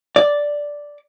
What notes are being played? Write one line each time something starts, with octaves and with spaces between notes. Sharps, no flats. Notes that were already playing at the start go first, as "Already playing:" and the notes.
D5